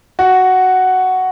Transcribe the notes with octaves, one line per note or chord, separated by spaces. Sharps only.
F#4